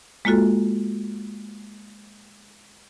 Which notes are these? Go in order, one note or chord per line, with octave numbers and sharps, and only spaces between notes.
G#3 A#3 F4 F#4 A4